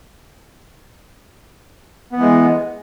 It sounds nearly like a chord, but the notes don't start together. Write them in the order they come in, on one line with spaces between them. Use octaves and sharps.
B3 E3 G#3